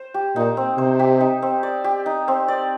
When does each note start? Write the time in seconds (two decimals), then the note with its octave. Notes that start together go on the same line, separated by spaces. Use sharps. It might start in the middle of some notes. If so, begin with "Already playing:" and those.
Already playing: C5
0.14 G4
0.36 A#2 D#4
0.57 C4
0.78 C3 C5
0.99 G4
1.21 D#4
1.42 C4
1.63 D5
1.84 G4
2.06 D#4
2.28 C4
2.48 D5